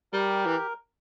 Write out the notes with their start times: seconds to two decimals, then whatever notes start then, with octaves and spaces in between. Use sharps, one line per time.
0.13 G3 G4 A#4
0.46 E3